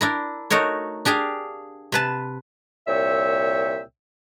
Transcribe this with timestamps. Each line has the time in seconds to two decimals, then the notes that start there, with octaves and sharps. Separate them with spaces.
0.01 D4 E4 A#4
0.50 A3 D#4 F#4 A#4 C#5
1.05 D4 G4 G#4 F5
1.92 C3 B4 A5
2.88 C2 A#2 C#5 E5 G5 E6